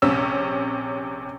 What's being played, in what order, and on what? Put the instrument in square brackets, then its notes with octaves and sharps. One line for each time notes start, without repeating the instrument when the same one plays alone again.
[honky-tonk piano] A#1 C3 C#4 E6